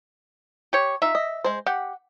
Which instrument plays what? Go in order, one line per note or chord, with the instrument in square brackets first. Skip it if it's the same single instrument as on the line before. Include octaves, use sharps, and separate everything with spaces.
[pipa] G4 C#5
[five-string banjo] D#4 F4 [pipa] E5
[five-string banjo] D#5
G#3 C5
[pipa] G4 [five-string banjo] F#5